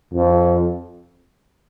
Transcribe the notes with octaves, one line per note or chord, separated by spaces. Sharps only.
F2